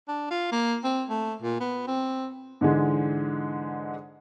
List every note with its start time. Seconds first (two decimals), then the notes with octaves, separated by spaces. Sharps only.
0.08 D4
0.30 F4
0.52 A#3
0.84 C4
1.10 A3
1.42 A#2
1.60 B3
1.87 C4
2.61 G#2 D3 E3 G#3